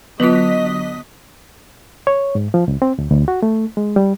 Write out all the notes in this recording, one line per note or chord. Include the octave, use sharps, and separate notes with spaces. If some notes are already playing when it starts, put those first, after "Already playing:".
D3 F#3 B3 F4 B4 D#5 B6
C#5
G#2
F3
C#2
C4
D2
D2
F#4
A3
G#3
G3